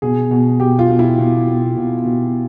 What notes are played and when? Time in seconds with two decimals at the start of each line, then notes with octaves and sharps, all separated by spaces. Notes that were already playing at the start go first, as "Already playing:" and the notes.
0.02 B2 G#4
0.31 B2
0.60 B2 G4
0.79 F4
0.89 B2
0.99 E4
1.18 B2
1.47 B2
1.76 B2
2.05 B2